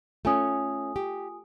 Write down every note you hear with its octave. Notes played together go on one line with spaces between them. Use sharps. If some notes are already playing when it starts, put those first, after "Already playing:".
A3 C#4 F4 G#5 D#6
G4